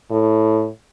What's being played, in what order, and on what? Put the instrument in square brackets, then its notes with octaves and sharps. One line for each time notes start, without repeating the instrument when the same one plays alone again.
[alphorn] A2